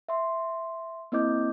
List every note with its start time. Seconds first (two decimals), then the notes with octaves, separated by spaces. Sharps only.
0.09 E5 C6
1.12 A#3 C4 E4 D#5 D6 G6